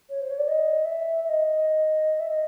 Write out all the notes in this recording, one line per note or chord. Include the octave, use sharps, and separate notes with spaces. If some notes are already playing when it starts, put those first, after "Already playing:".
C#5
C5
C#5
D5
D#5
E5
E5
D#5
E5
D#5